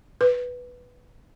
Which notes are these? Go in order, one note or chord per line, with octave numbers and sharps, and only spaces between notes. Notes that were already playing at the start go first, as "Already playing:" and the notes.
B4